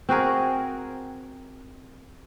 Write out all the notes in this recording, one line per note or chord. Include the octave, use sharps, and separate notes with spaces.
C4 F#4 G#4 A#4